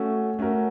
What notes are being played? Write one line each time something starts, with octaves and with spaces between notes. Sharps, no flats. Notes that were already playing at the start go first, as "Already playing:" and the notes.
Already playing: A3 C#4 F#4 A4
A3 C#4 F#4 A#4